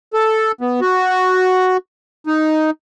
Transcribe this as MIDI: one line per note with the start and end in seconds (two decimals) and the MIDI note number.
0.14 0.52 69
0.61 0.80 59
0.81 1.77 66
2.27 2.70 63